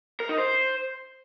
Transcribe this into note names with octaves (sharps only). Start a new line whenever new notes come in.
A#4
D#4
C5